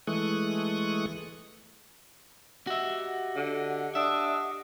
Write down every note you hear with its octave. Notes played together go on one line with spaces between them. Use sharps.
E3 G#3 A3 C#6 D#6 F#6
F#4 G4 D#5 E5 F#5
D3
D4 E5 D#6